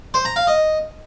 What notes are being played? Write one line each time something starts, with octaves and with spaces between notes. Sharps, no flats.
C5
A#5
F5
D#5